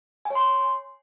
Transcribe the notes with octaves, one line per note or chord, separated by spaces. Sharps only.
G#5
C#5
C6